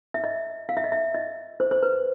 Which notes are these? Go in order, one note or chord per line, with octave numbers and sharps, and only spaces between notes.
E5
D#5
F5
E5
D#5
E5
D#5
C5
C5
B4